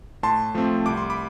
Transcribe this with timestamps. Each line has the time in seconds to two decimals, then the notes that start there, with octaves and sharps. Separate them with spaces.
0.23 A2 A5 C6
0.55 F3 A3 C4
0.86 C2 D6
0.97 C6
1.10 B5 D6